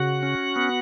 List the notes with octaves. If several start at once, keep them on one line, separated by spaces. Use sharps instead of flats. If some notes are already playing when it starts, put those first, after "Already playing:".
Already playing: C#3 F#4 F#5
C#4
B3